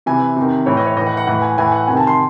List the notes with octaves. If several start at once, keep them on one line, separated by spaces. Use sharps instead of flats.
C3 E3 G#5
C3 D#3
A2 E3 C#5
D#5
C#5
A2 E3 D#5
F#5
F#5
A2 E3 F#5
G#5
A2 E3 G#5
F#5
C3 D#3 G#5
A5
C6